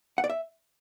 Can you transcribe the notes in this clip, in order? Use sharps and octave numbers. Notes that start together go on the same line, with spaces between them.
F#5
D5
E5